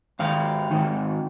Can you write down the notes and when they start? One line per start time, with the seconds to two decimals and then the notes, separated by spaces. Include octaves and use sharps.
0.19 G#2 D#3 F5
0.71 G#2 D#3